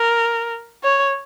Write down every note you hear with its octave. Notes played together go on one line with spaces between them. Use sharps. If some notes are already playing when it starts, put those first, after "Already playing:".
Already playing: A#4
C#5